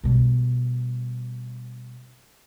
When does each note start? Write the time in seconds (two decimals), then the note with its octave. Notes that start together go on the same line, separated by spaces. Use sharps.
0.04 B2 G3